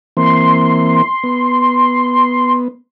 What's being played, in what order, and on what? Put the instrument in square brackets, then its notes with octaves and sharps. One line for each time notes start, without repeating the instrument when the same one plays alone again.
[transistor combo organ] E3 A#3 C4 [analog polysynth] C6
[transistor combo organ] B3